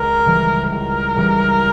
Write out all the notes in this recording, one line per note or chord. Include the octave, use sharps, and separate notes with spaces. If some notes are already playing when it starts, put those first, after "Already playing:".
Already playing: C#2 A#4
C#3 E3 G3
C#2 A#4
C#3 E3 G3